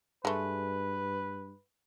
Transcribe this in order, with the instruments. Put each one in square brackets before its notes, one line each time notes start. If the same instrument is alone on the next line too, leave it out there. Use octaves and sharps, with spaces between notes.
[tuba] G2 [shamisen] G#3 A3 [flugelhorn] B4